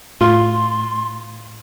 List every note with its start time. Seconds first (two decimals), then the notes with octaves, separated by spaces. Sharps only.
0.21 A2 F4 C6